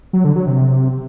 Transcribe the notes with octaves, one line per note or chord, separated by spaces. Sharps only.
F#3
D3
F#3
C3